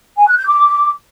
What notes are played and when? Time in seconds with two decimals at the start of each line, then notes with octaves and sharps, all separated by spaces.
0.18 G#5
0.27 F#6
0.37 G6
0.47 D6